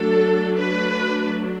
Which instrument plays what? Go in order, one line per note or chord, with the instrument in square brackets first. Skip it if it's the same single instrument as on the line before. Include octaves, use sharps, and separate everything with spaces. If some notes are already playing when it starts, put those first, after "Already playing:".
Already playing: [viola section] F#3 A3 D4 A4
B4